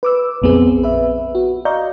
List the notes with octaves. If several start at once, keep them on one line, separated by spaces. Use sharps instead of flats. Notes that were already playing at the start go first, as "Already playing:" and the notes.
B4 D6 E6
A#1 F2 B3 C4 G#4
B4 E5
F#4
D5 D#5 F5 A#5 C#6 G6